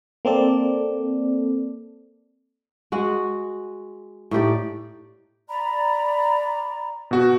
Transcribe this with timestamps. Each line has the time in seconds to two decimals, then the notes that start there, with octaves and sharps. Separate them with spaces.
0.25 A#3 C4 A4 D5
2.92 G#3 F#4 F#5
4.31 A2 D#4 G4 D5
5.49 D5 A#5 B5
7.11 B2 F#4